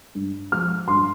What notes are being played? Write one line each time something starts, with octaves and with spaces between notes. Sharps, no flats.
G2
F3 G#3 F6
G2 C6